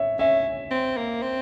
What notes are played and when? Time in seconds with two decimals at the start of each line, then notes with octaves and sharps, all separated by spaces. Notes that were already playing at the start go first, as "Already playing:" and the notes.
Already playing: C#5 E5
0.19 C#4 E5
0.71 C4
0.97 A#3
1.22 C4